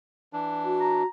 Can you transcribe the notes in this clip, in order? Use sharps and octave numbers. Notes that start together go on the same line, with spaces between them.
E3 D4
F#4
A#5